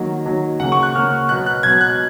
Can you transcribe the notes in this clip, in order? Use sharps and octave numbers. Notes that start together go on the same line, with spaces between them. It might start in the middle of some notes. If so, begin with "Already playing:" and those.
Already playing: D#3 F#3 A#3
D#3 F#3 A#3
C#3 F#3 A#3 F#5
C#6
F#6
C#3 F#3 A#3 F6
B2 F#3 B3 F#6
F#6
B2 F#3 B3 G#6
F#6